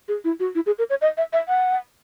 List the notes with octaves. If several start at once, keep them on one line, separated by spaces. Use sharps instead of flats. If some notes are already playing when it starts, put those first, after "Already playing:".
G#4
E4
F#4
E4
G#4
A#4
C#5
D#5
E5
E5
F#5